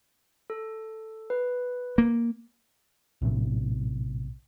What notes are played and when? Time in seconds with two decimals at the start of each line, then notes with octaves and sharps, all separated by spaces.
0.50 A4
1.30 B4
1.98 A#3
3.22 A#1 A2 C3